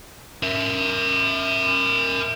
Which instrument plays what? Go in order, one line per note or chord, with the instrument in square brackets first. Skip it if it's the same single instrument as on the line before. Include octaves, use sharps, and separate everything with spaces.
[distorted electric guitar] A#4 E5